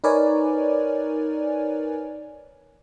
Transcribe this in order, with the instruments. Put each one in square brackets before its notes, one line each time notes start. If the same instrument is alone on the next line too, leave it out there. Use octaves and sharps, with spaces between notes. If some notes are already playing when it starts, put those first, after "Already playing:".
[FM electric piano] D#4 A#4 B4 C#5 D5 G#5